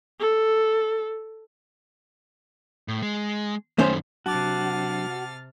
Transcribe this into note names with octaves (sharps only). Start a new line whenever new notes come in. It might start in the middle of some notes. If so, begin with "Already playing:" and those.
A4
A2
G#3
F#2 D#3 A3 C#4 C5
C3 F#3 D4 F#4 A5 D6 F6 A6